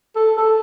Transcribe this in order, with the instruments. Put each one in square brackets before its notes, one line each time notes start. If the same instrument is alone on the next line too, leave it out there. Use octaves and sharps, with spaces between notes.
[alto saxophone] A4
A4